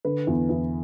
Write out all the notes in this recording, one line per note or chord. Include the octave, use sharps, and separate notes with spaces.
D3 B4
E2
E2